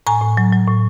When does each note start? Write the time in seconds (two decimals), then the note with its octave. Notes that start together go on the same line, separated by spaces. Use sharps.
0.07 A2 G#5 A#5
0.21 A2
0.37 F#3
0.53 F#3
0.67 A2